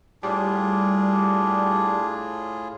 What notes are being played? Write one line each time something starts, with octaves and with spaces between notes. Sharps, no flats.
A2 G3 D4 F4 G#4